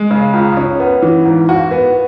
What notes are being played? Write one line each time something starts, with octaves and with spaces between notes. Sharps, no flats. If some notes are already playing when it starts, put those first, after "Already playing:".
Already playing: G#3
C#3
C#2
C#4
B3
E3
G#2
F#4
B3